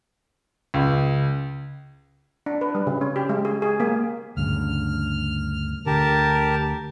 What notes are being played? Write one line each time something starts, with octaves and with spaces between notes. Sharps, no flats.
C#2
D4
B4
G3
C#3
C#4
G4
G#3
G#4
G#4
A#3
D2 G2 C#3 F6
D2 D3 G4 A#4 A5